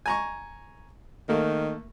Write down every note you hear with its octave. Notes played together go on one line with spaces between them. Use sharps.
G#5 A#5 C#6
D#3 A3 A#3